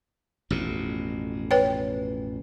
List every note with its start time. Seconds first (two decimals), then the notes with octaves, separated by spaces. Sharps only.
0.50 A1 F2 B2
1.51 B4 C#5 G5